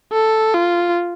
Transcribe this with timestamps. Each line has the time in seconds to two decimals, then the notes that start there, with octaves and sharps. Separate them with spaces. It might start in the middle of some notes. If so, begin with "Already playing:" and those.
0.13 A4
0.54 F4